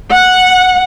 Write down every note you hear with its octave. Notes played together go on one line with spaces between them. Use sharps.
F#5